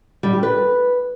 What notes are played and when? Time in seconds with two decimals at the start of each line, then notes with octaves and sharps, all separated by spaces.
0.23 G3
0.33 G4
0.43 B4